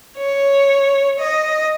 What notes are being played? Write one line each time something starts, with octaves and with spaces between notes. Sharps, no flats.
C#5
D#5